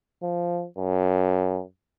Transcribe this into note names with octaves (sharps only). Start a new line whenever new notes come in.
F3
F#2